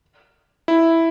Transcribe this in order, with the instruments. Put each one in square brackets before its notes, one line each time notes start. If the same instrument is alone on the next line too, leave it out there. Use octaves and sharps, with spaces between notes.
[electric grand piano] E4